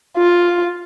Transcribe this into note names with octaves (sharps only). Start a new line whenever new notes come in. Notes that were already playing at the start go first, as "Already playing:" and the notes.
F4